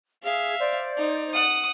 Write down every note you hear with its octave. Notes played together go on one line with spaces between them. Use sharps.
G#4 E5 F5
C5 D5
D#4
F#5 D#6